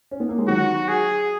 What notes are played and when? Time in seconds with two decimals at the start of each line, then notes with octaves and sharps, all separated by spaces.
0.11 C#4
0.20 B3
0.29 A#3
0.38 G#3
0.47 D#3 F#3 F#4
0.88 G#4